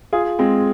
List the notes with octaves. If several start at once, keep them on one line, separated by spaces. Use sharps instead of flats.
F4 G#4
G#3 C4